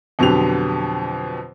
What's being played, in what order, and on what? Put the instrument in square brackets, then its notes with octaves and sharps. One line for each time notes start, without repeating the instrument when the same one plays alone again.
[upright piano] F2 B2 D3 F#3 G4 F7